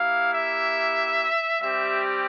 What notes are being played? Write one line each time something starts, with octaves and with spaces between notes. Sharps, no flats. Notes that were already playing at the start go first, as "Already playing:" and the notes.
Already playing: A#3 E4 G4 F5
E5
G3 C4 G4 E5